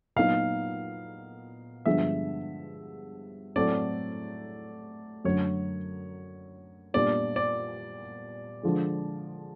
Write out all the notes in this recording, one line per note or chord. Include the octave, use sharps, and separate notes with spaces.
A#2 F#3 B3 D#4 F5
G2 D3 F3 G#3 B3 E5
A2 F#3 A3 C4 D5
F#2 D3 F#3 A3 C#5
A#2 G3 B3 D4 D5
D5
D3 F3 G#3